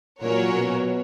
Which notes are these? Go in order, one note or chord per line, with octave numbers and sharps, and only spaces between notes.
A#2 F#3 C#4 F#4 A#4 C#5
B2